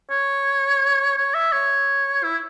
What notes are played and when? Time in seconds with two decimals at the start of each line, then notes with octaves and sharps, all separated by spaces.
0.10 C#5
1.17 C#5
1.34 E5
1.52 C#5
2.24 E4